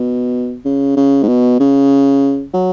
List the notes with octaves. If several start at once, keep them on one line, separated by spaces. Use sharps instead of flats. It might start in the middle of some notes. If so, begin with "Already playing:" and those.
Already playing: B2
C#3
C#3
G#2
B2
C#3
F#3